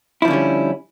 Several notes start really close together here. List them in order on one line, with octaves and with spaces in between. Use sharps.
E4 F3 D3 C#4 G3